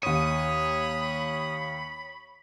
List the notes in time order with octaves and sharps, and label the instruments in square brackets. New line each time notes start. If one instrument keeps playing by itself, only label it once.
[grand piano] D#2 D#7 [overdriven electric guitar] C#5 [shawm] B5 [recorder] D#6